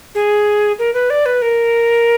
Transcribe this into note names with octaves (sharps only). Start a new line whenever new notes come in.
G#4
A#4
B4
D5
B4
A#4